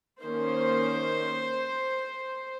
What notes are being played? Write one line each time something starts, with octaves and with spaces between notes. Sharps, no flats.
D#3 A#3 C#4 C5